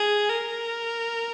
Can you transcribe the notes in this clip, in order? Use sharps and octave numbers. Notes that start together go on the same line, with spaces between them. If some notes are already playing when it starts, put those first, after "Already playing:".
Already playing: G#4
A#4